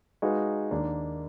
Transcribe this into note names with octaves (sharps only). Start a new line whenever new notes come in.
G#3 D#4 F#4 B4 F5
D#2 D#3 A#3 D4